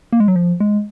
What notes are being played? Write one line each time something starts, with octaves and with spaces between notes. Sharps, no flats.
A#3
G#3
F#3
F3
G#3